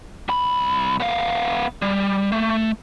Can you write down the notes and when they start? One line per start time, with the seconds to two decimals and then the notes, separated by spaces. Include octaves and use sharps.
0.29 C2 B5
1.00 B3 F5
1.82 G3
2.32 A3